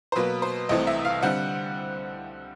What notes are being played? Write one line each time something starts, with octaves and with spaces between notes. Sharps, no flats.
C5
B2 F#3 A#3 B4
C5
C2 C3 E3 A3 C4 D#5
E5
F5
D3 G3 C4 F#5